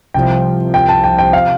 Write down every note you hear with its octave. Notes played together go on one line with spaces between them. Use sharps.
C2 C3 F3 G5
G5
A5
G5
G5
C3 F3 F5